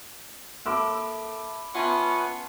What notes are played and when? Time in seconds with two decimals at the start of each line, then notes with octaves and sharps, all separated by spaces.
0.66 A#3 A4 E5 A5 B5 D6 E6
1.75 B3 C#4 F4 E5 F#5 A5 C6